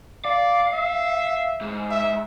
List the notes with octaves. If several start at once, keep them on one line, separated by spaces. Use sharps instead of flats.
D5 F5
E5
G#2
E5